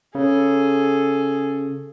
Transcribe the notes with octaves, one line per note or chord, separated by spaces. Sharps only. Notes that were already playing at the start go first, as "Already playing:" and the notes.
C#3 G#4 A4